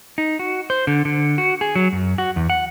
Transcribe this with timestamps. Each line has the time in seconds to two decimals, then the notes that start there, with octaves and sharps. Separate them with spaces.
0.18 D#4
0.39 F#4
0.70 C5
0.87 D3
1.05 D3
1.38 F#4
1.61 G#4
1.76 F#3
1.93 F#2
2.18 F#4
2.36 E2
2.50 F#5